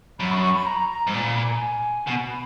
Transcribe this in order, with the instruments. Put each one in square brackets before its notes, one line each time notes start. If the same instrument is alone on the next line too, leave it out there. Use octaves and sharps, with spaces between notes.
[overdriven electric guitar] F#2 [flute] B5
[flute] C#6
C#6
B5
A#5
A#5
[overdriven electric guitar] G#2
[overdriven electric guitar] A#2 [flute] A#5
[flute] B5
A#5
G#5
[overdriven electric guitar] B2
[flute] B5